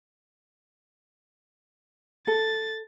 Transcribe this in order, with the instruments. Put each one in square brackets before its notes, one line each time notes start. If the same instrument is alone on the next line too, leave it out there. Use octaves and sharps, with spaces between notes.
[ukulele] A4 [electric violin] A6